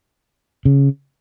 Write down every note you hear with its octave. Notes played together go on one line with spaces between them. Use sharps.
C#3